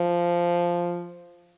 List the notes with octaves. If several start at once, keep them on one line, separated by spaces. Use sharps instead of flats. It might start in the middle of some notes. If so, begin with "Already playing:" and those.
Already playing: F3